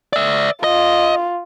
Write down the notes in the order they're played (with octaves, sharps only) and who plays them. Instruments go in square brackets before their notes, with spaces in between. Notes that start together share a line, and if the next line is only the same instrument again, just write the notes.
[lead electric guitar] D5 E5
[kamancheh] F4 [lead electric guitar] D#5